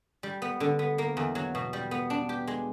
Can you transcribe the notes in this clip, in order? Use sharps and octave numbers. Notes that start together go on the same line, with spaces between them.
G3
B3
D3
B3
A#3
E2
F#3
B2
G3
B3
D4
G4
G#3